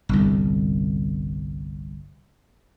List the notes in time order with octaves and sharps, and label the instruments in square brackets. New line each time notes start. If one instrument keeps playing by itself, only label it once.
[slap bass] G1 C2